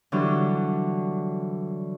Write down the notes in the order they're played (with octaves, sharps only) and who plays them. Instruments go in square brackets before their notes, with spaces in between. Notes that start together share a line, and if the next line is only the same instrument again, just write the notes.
[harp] D3 E3 F#3 G3 D4